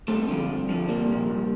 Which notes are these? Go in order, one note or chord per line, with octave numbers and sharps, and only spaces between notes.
G2 A3 C4
D3 F3
G2
D3 F3
C2 G3 A#3
A#2 F3
C2